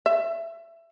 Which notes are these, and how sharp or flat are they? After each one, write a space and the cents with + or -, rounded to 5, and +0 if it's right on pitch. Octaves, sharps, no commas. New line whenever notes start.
E5 +20